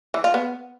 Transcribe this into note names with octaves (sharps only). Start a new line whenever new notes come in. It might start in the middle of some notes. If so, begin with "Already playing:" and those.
E3
F4
B3